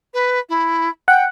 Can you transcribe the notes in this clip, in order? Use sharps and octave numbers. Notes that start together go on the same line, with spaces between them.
B4
E4
F#5 G5